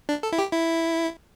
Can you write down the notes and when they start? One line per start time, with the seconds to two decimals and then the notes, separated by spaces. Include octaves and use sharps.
0.09 D4
0.23 A4
0.32 E4
0.39 G4
0.53 E4